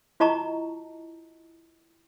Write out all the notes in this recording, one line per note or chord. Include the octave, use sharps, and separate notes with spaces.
E4 F4 D#5 A5 A#5 C#6